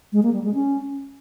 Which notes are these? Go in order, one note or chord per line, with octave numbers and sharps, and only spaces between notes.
G#3
A#3
G3
G#3
C#4